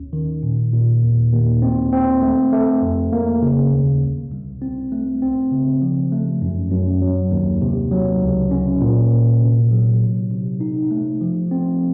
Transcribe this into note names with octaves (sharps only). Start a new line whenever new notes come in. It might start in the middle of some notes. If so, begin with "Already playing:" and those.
Already playing: D#2 C#4
D#3
A#2
A#2
D#2
D#2
C4
C4
A3
A3
F2
A#3
C#3
D#2
C2
C2
C4
A3
C4
C#3
F3
A3
F#2
F#2
F#3
D#2
C3
F#3
C#2
C#4
A#2
A#2
C3
F#3
C3
C3
D#4
A3
F3
C4